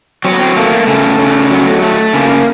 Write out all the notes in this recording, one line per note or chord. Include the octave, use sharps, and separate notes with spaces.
F#3 C4
B3
C4
A3 A#3
C#3 A3
C#3
F#3
A3
C#3 A#3